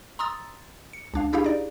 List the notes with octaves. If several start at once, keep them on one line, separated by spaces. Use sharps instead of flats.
A#5 C6 D#6 E6 A6
C#7
C#2 D4 F5
D4 E4 G4 G#4 F5
D#4 D5